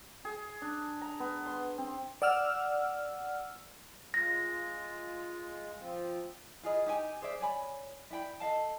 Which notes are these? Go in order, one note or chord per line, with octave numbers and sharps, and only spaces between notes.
G#4
D4
A#5
B3
C6
C4
D5 F#5 E6 F6
G#3 F4 A#6
F3 C4 F4
F4 G#4 D#5 B5
D#4 G4 G#5
G#4 C5 D5 E5
C#5 D5 G#5 B5
E4 D5 G5 B5
A4 D#5 F5 A5